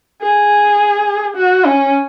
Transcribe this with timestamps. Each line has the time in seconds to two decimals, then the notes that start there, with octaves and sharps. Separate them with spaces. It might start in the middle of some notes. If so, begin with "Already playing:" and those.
0.22 G#4
1.36 F#4
1.65 C#4